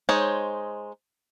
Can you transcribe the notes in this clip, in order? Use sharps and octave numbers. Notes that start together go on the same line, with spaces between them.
G#3 D#4 C5 C#5